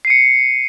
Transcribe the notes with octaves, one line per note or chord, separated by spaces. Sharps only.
C7 C#7 D#7